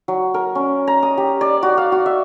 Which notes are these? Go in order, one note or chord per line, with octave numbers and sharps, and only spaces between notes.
F#3
A#4
C#4
A#5
D#6
G4
D5
F#4
F5
F#4
E5